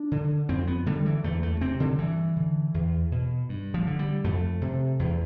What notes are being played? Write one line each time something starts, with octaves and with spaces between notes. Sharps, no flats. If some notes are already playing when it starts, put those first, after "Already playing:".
Already playing: D4
D3
F2 C4
B3
D3 G3
E3
E2 A3
A3
C3 C4
D3
G2 E3
D3
E2
B2
G2
F3
D3
G3
F2 A3
C3
E2